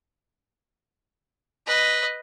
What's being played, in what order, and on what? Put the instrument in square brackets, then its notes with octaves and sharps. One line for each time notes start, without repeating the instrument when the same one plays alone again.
[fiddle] B4 D#5